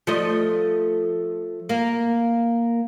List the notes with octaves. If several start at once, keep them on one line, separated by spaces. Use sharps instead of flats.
F3 A3 D#5
A#3